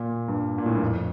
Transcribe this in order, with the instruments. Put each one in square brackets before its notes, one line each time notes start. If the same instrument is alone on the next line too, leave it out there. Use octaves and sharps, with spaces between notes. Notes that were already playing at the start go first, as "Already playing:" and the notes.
Already playing: [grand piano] A#2
G2
A#2
A2
G2
F2